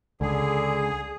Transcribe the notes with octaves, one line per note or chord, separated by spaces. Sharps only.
C#2 D3 G#4